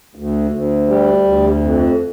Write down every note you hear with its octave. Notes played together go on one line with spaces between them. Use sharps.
D2
D2
G3
D2
F2